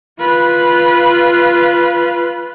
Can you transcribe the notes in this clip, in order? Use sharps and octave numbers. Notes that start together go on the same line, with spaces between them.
F4 B4